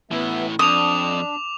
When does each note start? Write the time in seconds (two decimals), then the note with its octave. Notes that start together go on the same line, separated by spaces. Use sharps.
0.11 A2 E3 B3 E5
0.59 F2 D4 D6 D#6 F7